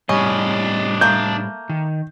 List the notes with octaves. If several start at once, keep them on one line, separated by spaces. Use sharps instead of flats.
A2 G3 C#4 D4 D#5
A3 A#3 G6
D#3